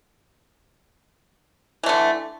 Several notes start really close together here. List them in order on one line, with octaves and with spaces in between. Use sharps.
E3 A3 D3